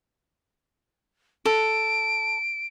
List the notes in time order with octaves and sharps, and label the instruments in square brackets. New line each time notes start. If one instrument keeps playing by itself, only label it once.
[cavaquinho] A4 [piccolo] D7